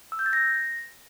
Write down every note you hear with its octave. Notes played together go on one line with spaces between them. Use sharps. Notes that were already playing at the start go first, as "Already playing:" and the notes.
E6
G6
A6
A#6